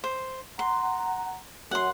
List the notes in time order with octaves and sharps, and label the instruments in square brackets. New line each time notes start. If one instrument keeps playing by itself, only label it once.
[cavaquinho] C5
[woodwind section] F#5 A#5 [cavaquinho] C6
[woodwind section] F#2 [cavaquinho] F#5 C6